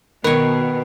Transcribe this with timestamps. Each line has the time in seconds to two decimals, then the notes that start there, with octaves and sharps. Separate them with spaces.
0.24 B2 D#3 A#4 B4 C#5